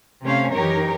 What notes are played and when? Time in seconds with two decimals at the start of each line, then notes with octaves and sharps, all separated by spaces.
0.23 C3 A3 C#4 C5 F5
0.52 F#2 E3 D#4 G4 A#4 C#5